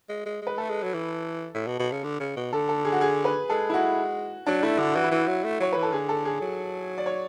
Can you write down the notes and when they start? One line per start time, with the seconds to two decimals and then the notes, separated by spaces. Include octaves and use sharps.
0.09 G#3
0.26 G#3
0.42 G#3 B4
0.58 A3 A4
0.70 G#3
0.83 F#3
0.94 E3
1.55 A2
1.67 B2
1.79 B2
1.92 C#3
2.04 D3
2.20 C#3
2.36 B2
2.53 D3 A4
2.69 A4
2.85 G#4
2.92 F#4
3.01 G#4
3.25 B4
3.50 G#3 A4
3.70 E4
3.74 F#4
4.47 F#3 D4
4.63 A3 E4
4.79 D3 F#4
4.96 E3 F#4
5.04 E4
5.11 E3 F#4
5.28 F#3
5.44 A3
5.60 F#3 C#5
5.73 E3 B4
5.83 A4
5.92 D3 G#4
6.09 A4
6.25 G#4
6.41 F#3
6.98 D5
7.06 C#5